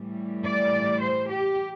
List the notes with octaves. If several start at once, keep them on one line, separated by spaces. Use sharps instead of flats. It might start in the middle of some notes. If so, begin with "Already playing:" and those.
Already playing: A2 E3 G3
D5
C5
G4